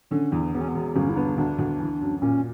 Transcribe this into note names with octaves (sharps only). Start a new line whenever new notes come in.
D3 C#4
E2 B3
E1 B3
C#4
B3
E1
G1 C#4
E4
B3 D4
D2 D4
D2
E3
F#2
A#2 C#4